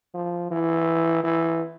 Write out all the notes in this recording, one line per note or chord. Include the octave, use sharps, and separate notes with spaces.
F3
E3
E3